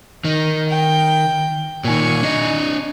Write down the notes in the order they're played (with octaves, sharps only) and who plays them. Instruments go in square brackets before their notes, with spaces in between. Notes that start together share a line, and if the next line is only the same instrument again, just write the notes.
[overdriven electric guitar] D#3 [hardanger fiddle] D#5
[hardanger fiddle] G5
[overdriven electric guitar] A#2 D#3 [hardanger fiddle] G#5 C#6
[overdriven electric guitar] D4 D#5